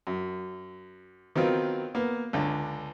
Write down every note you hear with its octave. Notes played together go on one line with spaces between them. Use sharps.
F#2
D#3 F#3 B3 C4 F4
A#3 B3
C#2 D3